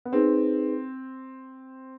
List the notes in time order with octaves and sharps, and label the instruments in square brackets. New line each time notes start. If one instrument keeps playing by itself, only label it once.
[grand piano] B3
[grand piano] C4 [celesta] D#4 G#4 B4